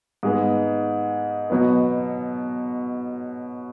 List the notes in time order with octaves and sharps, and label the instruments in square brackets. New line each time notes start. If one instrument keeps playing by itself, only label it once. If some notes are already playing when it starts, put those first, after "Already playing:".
[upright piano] G#2 G#3 B3
B2 F#3 B3